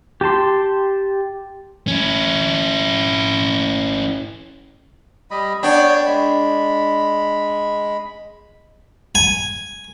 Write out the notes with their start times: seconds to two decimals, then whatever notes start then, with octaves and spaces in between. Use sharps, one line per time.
0.21 G4 G5 A5 C6
1.88 C#4 E4
5.31 G3 D#5 B5
5.63 B3 D4 C#5 G5
6.06 G#3 B5
9.15 G#5